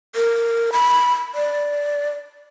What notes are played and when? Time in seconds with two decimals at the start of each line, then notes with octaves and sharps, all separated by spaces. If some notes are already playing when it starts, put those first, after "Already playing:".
0.15 A#4
0.73 B5
1.35 D5